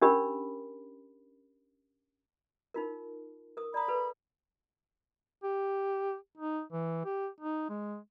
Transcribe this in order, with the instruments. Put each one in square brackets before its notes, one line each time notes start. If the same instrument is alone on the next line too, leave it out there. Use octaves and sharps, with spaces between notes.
[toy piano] C#4 D4 G4 A#4 B5
D#4 F4 A#4
A#4 D#6
[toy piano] D5 A#5 D#6 [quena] B5
[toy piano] A4 B4
[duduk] G4
D#4
E3
G4
D#4
G#3